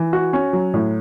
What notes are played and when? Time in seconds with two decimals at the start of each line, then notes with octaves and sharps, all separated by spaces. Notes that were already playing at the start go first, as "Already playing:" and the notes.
Already playing: E3
0.13 F#4
0.33 C#4
0.53 F#3
0.74 A2